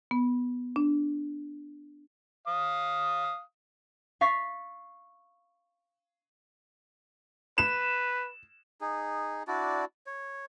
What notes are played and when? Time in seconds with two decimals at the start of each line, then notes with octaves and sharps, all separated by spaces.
0.11 B3
0.76 D4
2.47 F5 D#6
4.21 F5 C#6 A6 B6
7.58 B4 E7
8.81 D#4 G#4
9.48 D4 E4 F#4 D5
10.07 C#5